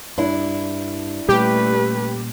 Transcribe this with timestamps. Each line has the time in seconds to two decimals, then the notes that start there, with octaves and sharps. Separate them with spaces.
0.18 G2 D4 E4
1.29 A#2 G3 A3 C#4 G4 B4